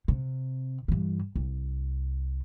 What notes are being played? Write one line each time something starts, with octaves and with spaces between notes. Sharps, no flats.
C3
G2 E3
C2